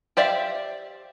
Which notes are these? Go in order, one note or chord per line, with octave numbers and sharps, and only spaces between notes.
G4 C5 D5 E5 F5